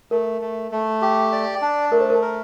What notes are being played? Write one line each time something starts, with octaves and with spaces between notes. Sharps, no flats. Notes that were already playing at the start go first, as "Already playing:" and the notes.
A3 A#4
A3
A3
G4
D5
D4
A3 A#4
C5
A#4
A#4